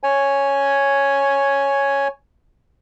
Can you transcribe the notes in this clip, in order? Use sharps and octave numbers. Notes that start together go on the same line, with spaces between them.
C#5 G#5